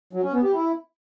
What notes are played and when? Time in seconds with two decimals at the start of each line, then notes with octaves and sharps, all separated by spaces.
0.13 F#3
0.23 C#4
0.33 B3
0.43 G4
0.53 E4